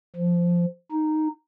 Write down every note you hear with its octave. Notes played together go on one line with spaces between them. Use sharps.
F3
D#4